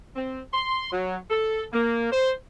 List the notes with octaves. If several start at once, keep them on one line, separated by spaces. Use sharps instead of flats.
C4
C6
F#3
A4
A#3
C5